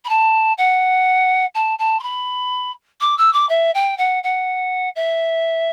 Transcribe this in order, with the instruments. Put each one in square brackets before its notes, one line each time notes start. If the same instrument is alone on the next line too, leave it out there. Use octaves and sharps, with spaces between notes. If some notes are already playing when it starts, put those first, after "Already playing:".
[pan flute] B5
A5
F#5
A5
A5
C6
B5
D6
E6
D6
E5
G5
F#5
F#5
E5